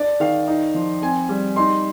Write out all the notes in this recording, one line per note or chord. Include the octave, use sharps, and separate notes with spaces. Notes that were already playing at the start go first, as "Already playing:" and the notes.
Already playing: D4 D5
D#3 F5
D#4
F3
C4 G#5
G3
D#4 C6